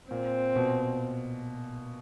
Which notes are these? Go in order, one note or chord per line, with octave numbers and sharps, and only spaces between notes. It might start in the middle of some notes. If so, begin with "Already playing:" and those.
A#2 C4
B2